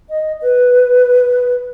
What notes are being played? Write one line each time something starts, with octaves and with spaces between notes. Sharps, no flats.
D#5
B4